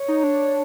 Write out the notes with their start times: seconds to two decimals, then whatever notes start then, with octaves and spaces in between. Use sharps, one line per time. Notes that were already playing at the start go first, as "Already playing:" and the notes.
Already playing: C#5
0.08 D#4
0.23 D4